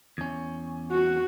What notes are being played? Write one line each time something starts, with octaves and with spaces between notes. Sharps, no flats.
E2 C#4
F#4